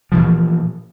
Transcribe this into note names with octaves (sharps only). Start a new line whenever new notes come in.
A#2 C#3 E3 F3